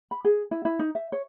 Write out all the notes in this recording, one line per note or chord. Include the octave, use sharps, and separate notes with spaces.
B5
G#4
E4
E4
D#4
E5
C#5